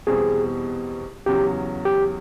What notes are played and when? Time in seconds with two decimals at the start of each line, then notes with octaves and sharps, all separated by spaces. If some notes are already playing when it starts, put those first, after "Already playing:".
0.07 E2 B2 G3 C4 G#4
1.26 E2 C#3 F#3 G4
1.85 G4